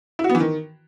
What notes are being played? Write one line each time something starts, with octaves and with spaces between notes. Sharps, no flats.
E4
F#4
B3
E3
D#3